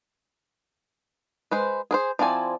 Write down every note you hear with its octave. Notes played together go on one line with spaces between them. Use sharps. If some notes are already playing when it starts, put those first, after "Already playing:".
G#3 B4 C5
G#4 A#4 C5
F3 C4 E4 D5 G#5